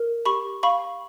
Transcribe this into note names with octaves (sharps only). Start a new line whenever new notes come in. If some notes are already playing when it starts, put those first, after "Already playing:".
Already playing: A#4
G4 B5 C#6
F5 B5 C#6